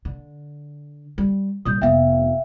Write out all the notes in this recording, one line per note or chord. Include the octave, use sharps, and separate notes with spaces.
D3
G3
A#2 G3 D#6 G6
F1 B3 E5 F5 G5